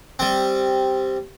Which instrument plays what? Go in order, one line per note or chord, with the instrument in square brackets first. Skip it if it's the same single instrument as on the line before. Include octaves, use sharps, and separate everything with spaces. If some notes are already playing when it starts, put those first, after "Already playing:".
[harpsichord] G3 C4